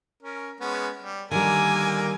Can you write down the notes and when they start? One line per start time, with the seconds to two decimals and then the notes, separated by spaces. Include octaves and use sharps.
0.23 C#4 A#4
0.60 G#3 B3 C#4
1.02 G3
1.31 D3 D#3 G3 A#3 A#4 G#5